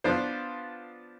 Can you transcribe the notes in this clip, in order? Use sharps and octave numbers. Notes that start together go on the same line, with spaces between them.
F3 B3 D4 F4 C5